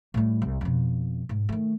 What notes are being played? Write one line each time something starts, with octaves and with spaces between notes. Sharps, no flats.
A2 G3
C2
F2 B2
G#2
D#3 A3